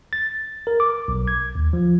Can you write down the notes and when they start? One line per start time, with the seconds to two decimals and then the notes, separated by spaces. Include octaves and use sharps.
0.13 A6
0.67 A#4
0.80 D6
1.08 B1
1.28 G#6
1.55 D#2
1.73 F3